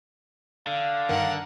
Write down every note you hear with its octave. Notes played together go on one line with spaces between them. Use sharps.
D3 F5
G2 D#3 A#4 F#5